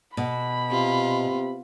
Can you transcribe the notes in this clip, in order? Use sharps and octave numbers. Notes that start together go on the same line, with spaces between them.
B2 B5
C3 F4